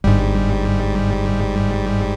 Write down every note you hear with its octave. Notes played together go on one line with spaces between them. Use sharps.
G1 G#2 G3